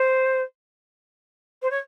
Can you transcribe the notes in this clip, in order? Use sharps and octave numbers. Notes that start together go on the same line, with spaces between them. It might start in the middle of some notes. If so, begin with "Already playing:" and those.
Already playing: C5
C5
C#5